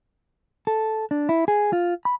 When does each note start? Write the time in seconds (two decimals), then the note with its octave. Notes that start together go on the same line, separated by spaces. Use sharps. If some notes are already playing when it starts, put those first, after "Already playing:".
0.67 A4
1.11 D4
1.29 E4
1.48 G#4
1.73 F4
2.05 B5